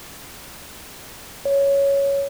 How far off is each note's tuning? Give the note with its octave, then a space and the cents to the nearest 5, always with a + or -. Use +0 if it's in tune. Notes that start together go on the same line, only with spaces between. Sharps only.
C#5 +5